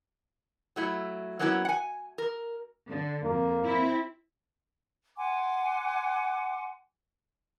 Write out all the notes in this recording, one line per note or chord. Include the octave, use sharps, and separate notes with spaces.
F#3 A3 E4
F#3 A#3 B3 C#4 D#4 E4
F#5 G#5
A#4
D3
F2 A#3
C4 E4
F#5 G#5 C6 D6